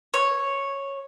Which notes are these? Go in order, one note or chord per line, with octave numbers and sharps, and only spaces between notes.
C#5